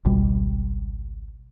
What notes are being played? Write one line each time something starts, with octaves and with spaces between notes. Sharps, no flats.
G#1 C#2 B2 G3